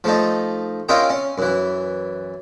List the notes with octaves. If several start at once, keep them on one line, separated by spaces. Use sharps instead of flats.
F3 A3 D#4
C#4 E4 F4 A#4 D#5 G5
C#4
F#2 E3